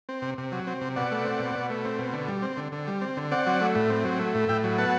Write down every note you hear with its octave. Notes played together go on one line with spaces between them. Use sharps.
C4
C3
C3
F#3
C4
C3
B2 D5 F#5
A3
C4
B2
B2
A3
C4
B2
D3
G3
C4
D3
D3
G3
C4
D3
C4 D5 F#5
F#3
A3
A2
C4
F#3
A3
A2
A2 E5 G5
F#3
B3 F#5 A5